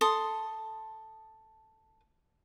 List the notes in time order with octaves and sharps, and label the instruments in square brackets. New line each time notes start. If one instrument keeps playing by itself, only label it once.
[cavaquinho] A4 C6 D#6